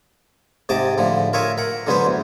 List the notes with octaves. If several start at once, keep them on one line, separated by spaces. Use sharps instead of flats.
G#2 C3 D#5 A5 D6
A2 D3 F3
F4 A#4 C#5 D#5 E5 G#5
A#4 F#5
D3 F#3 G#3 B3 B4 C5
E2